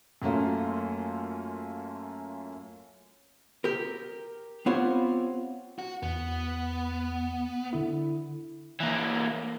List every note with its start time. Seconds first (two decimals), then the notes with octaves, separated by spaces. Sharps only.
0.22 F#2 A3 A#3 C#4 F4
3.64 G4 A#4
4.66 B3 C4 F4 G4 C5 C#5
5.79 F#4
6.03 E2 B3
7.73 D3 E4
8.80 E3 A#3